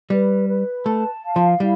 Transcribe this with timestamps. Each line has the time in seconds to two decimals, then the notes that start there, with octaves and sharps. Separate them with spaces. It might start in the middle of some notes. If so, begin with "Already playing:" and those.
0.10 G3 B4
0.48 B4
0.86 A3 A5
1.23 F5
1.36 F3
1.60 G3 E4